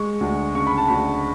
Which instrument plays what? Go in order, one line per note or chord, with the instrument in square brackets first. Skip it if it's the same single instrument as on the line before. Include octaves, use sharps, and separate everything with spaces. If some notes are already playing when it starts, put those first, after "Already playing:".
Already playing: [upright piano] G#3 C#6
D2
C#3 C#6
B5
A5
D2 B5